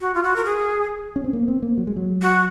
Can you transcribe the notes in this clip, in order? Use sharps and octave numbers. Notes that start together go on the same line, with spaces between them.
F#4
F4
F#4
A#4
G#4
C#4
C4
A#3
C4
A#3
F#3
G#3
F#3
F#4